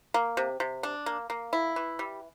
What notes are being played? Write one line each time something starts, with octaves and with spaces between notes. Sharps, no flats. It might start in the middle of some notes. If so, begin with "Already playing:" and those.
A#3
C3
C3
D4
A#3
A#3
E4
E3
G3